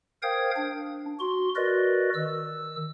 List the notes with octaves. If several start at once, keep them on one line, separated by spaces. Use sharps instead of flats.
A#4 C5 F5 G5 D#6 G#6
D4
F#4 C6
F#4 A#4 B4 D5 D#5
D#3 E6